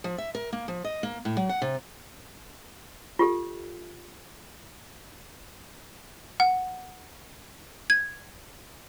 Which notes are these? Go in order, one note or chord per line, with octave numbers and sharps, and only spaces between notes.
F3
E5
A#4
A#3
F3
D#5
A#3
A2
F#3
F#5
C3
F4 G4 A4
F#5
G#6